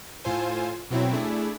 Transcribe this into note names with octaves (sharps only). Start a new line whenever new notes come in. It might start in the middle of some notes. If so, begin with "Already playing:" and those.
A2 F4 A4 C5 G#5
B2 F#3 C4 E4
A3 D4 E4 G#4